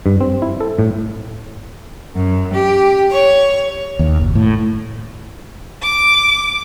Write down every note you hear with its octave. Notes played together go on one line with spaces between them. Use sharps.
G2
C4
E4
A4
A2
F#2
G4
C#5
D#2
F#1
A2
D6